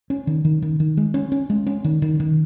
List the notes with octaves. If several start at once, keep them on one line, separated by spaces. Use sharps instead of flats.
C#4
D#3
D#3
D#3
D#3
G#3
C#4
C#4
G#3
C#4
D#3
D#3
D#3